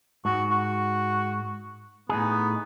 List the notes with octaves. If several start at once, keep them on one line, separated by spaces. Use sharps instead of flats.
G#2 F#4
F#4
A2 B3 D#4 G#4